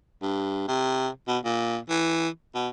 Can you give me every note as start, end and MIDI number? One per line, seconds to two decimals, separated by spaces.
0.22 0.67 43
0.68 1.08 48
1.28 1.38 47
1.44 1.78 46
1.90 2.29 52
2.55 2.69 47